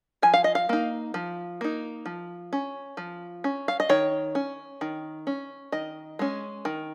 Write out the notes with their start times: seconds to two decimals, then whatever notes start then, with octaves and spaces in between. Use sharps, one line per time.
0.22 F3 G#5
0.34 F5
0.44 D#5
0.55 F5
0.69 A#3 D#4
1.14 F3
1.61 A#3 D#4
2.06 F3
2.53 C#4
2.97 F3
3.44 C#4
3.68 F5
3.80 D#5
3.89 D#3 C#5
4.35 C#4
4.81 D#3
5.27 C#4
5.72 D#3 D#5
6.19 G#3 C#4
6.65 D#3